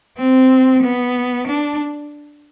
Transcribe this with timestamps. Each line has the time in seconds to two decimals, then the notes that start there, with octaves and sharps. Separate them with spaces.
0.18 C4
0.83 B3
1.48 D4